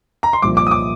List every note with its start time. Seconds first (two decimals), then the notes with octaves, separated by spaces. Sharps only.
0.23 A#5
0.33 C6
0.42 C2 A#2 F3 D6
0.57 D6
0.67 D#6
0.71 D6